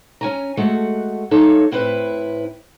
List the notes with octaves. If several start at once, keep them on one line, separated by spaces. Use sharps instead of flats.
C#4 G#5 A#5
G#3 A3 F#4 A4 F#5
A3 D#4 A4 C#5 F5
A2 C4 E4 B4